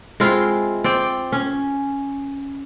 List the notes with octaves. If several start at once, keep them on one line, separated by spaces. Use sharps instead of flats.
G#3 C4 E4 F4
C4 D5 G5
C#4